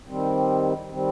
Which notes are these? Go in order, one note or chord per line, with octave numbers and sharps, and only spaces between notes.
D#3 G3 C4
D#3 G3 C4